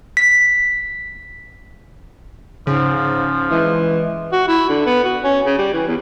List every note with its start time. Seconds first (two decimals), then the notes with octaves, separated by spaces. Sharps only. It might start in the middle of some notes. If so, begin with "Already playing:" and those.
0.17 B6
2.67 G#2 C#3 F3
3.51 E3 G#3
4.32 F#4
4.48 E4
4.69 D3
4.86 B3
5.04 F#4
5.23 C#4
5.46 C#3
5.58 G3
5.73 E3
5.87 E2